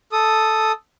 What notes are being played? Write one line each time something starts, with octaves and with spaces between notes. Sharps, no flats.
A4 D#6